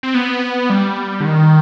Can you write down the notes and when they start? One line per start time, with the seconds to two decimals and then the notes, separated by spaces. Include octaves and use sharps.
0.03 C4
0.15 B3
0.70 G3
1.20 D3
1.25 D#3